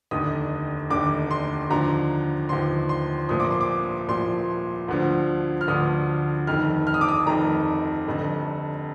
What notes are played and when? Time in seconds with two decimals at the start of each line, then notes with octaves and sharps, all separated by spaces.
0.11 F1 D#2 D3 D#6
0.90 F1 D#2 D3 D6
1.31 C6
1.70 D#2 D3 F3 A#5
2.49 D#2 D3 F3 C6
2.89 C6
3.28 C2 A#2 F3 D#6
3.40 D6
3.51 C6
3.61 D6
4.08 C2 A#2 F3 C6
4.88 D2 D3 F3
5.61 F6
5.68 D2 D3 F3 D#6
6.47 F1 F2 D#3 F6
6.87 F6
6.94 D#6
7.01 D6
7.08 D#6
7.26 F1 F2 D#3 A#5
8.07 F1 F2 D3